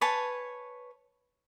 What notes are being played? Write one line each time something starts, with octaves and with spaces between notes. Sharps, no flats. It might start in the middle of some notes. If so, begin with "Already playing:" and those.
B4 C#5 G#5 A5